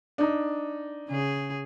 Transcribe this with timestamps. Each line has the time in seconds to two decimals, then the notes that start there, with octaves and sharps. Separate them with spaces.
0.18 D4 D#4
1.08 C#3 G#4